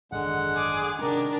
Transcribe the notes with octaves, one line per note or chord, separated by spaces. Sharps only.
G#1 F#2 D3 G#3 F#5
G#4 D6
C3 D#3 G#3 C#4 D4 A#4